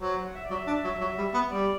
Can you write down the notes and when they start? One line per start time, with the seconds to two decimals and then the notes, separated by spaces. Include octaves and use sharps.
0.01 F#3 C5
0.26 F#5
0.35 E5
0.44 D5
0.50 F#3
0.53 E5
0.67 D4
0.84 F#3
1.01 F#3
1.18 G3
1.34 B3
1.50 G3 D5